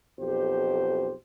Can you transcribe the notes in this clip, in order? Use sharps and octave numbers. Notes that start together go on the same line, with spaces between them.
B1 F2 G4 C5